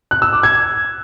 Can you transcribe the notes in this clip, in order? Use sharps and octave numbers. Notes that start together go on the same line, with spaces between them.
F#6
E6
D6
G#6